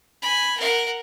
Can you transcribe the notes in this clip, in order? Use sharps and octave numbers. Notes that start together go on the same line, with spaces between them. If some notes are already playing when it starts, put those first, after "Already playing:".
G#5 B5
A#4 F#5